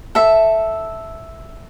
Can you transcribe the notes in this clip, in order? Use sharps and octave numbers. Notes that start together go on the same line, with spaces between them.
A4 E5